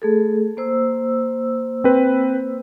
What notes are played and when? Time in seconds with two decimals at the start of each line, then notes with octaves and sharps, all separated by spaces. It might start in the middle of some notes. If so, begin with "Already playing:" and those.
0.02 A3 G#4 A4
0.57 A#3 C5 E6
1.84 C4 B4